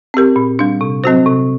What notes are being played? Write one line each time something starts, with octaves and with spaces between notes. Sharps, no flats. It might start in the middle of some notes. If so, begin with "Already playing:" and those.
C4 G4 A#4
A#2
G3 D4
C3
F#3 C4 F#4 C5
C3